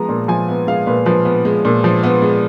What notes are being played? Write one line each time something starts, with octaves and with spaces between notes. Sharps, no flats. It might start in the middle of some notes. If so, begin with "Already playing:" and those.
Already playing: F3 G#3 B3 A#5
A#2
F3 G#5
B3
G#3 F5
A#2 B4
F3 B4
B3
G#3
A#2
F3
B3
G#3